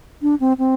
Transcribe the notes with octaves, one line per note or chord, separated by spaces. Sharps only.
D4
C4
C4